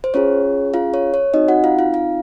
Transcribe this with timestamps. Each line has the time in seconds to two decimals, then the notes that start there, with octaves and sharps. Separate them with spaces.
0.04 C5
0.14 C#4 F4 G#4 C#5
0.74 F4 F5
0.94 C#5
1.14 C#5
1.34 C4 D#4 F#4 D#5
1.48 F#4 F#5
1.64 F4 F5
1.79 F4 F5
1.94 F4 F5